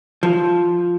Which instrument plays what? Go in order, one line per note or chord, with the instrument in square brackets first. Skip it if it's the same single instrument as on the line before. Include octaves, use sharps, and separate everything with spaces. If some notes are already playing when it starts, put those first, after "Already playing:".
[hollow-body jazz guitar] F3